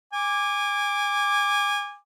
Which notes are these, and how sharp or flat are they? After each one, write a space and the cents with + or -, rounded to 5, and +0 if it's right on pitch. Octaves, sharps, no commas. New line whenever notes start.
G#5 -25 D6 +0